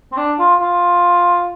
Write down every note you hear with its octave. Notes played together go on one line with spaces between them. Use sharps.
C4
D4
F4
F4